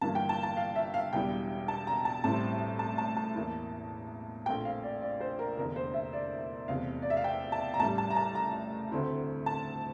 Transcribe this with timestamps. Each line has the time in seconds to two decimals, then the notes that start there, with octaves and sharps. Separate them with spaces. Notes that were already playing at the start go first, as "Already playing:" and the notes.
0.01 G1 G2 E3 A#3 A5
0.15 G5
0.29 A5
0.43 A5
0.57 F5
0.76 E5
0.94 F5
1.13 E1 E2 E3 G3 G5
1.68 A5
1.87 A#5
2.05 A5
2.24 A1 A2 G3 C4 E4 A5
2.79 A5
2.98 A5
3.17 A5
3.35 E2 E3 A#3 E4
4.46 A#1 A#2 A3 C4 G5
4.65 F5
4.83 D5
5.02 D5
5.21 C5
5.39 A#4
5.57 F1 E2 D3 A#4
5.76 C5
5.94 E5
6.13 D5
6.68 F1 E2 C3 F5
7.02 D5
7.10 E5
7.17 F5
7.24 G5
7.52 A5
7.74 A#5
7.79 A1 A2 G3 A5
7.98 A5
8.10 A#5
8.16 A5
8.35 A#5
8.91 D2 D3 A3 C4 E4
9.46 A5